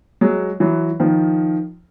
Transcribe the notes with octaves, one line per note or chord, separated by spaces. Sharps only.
F#3 G#3
E3 F#3
D#3 F3